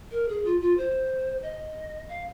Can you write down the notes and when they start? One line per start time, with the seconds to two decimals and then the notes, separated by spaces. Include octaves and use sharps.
0.12 A#4
0.29 G#4
0.45 F4
0.61 F4
0.77 C5
1.42 D#5
2.09 F5